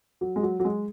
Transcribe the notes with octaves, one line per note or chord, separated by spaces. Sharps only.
F#3
G#3
F#3
F#3
G#3